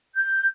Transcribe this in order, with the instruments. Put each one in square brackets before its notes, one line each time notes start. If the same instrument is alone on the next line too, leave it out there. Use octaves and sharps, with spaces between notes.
[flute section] G6